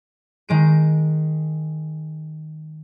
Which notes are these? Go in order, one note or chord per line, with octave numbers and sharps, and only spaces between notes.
D#3 G#3 D7